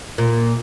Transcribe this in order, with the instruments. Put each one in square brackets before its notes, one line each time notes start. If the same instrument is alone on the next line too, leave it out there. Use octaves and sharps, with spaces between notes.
[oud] A#2